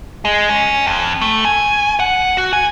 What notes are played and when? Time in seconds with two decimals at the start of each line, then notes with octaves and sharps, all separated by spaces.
0.25 G#3
0.50 C#4
0.87 F2
1.21 A3
1.45 G#5
2.00 F#5
2.37 F#4
2.53 G#5